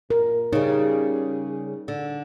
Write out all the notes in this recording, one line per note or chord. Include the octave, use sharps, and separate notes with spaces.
A#2 A#4
C#3 G3 D#4 G#4
D3